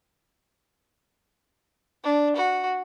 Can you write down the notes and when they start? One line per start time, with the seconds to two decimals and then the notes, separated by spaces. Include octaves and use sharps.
2.04 D4
2.36 F#4